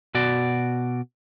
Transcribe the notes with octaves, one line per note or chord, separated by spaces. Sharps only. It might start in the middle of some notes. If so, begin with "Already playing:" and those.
B2 F#4 D5